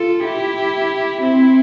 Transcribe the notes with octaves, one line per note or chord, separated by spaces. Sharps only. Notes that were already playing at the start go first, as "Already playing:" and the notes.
Already playing: F4 A4
E4 G4
C4 E4